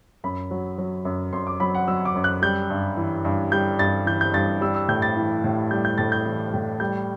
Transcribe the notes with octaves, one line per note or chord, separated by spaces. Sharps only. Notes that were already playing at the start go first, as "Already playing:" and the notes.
F#2 B5
F#3
F#3
F#2
F#2 C6
D6
F#3 B5
F#5
F#3 E6
D6
F#2
F#6
G3 G6
G2
E3
G2
G3 G6
G2 A6
E3 G6
G6
G2 A6
G3 E6
E6
A2 G6
A6
E3
A2
G3 G6
G6
A2 A6
G6
E3
A2
G3 G6